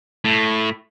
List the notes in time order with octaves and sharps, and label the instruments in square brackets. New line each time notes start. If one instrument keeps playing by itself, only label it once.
[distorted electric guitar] A2